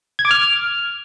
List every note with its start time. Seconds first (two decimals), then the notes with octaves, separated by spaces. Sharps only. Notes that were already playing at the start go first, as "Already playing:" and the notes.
0.19 G#6
0.25 D6
0.31 F6